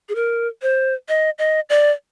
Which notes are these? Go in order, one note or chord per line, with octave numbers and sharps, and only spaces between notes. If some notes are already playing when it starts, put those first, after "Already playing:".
G#4
A#4
C5
D#5
D#5
D5